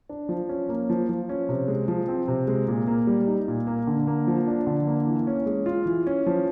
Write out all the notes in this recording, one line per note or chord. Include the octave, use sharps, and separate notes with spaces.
D4
F3
C#4
A#3
F3
F3
C#4
C3
G#3
F3
C4
C3
G#3
A#2
A#3
G3
D#4
A#2
A#3
D3
A#3
F3
D4
D3
A#3
E3
C#4
G#3
F4
E3
C#4
F3